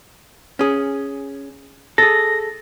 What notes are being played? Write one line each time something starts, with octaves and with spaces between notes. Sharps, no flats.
C#4 G#4
G#4 A4 A#6